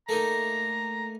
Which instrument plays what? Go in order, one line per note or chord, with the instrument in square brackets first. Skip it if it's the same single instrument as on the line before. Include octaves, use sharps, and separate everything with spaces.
[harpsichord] A3 A#3 D#4 [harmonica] A#5